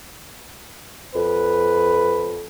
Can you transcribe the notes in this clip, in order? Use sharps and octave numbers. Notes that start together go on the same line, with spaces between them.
F2 B4